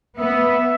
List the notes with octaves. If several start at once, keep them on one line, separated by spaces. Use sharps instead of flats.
B3 E5